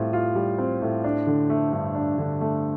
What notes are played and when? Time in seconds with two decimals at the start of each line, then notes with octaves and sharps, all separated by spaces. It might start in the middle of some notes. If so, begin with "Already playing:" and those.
Already playing: A2 G3 C4 F4
0.13 F4
0.35 G3
0.58 C4
0.82 A2
1.04 D4
1.27 D3
1.50 A3
1.72 G2
1.95 D4
2.18 D3
2.41 A3